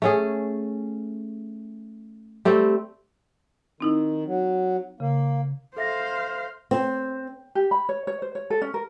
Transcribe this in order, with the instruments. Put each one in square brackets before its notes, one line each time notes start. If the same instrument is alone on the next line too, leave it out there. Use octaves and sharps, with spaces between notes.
[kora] A3 C#4 G#4
G3 A3 C4
[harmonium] D#3 [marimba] C4 D#4 E4
[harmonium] F#3
[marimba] C#3 [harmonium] A#3
[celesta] A4 E5 A#6 [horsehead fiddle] C5 F5
[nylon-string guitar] C4
[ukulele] G4
B5
C#5
C#5
C5
C#5
A4
C#4
A#4